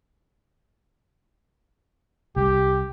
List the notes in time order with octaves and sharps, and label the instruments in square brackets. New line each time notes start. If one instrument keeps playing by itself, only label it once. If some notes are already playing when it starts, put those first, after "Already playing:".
[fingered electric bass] C2 [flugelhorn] G4